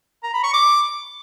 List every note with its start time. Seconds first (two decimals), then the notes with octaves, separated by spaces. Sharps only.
0.23 A#5
0.33 B5
0.44 C#6
0.54 D6